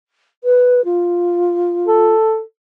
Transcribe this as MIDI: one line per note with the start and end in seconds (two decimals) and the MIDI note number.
0.44 0.84 71
0.85 2.14 65
1.87 2.41 69